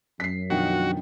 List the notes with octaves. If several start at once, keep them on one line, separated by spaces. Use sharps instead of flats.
F#2 B6 C7
B2 D#3 F3 D4 F#4 G5